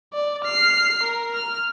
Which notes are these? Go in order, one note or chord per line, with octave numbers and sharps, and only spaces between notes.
D5
F6 C7
A#4
F6